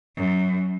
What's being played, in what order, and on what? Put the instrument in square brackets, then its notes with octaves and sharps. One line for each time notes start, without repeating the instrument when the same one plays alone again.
[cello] F#2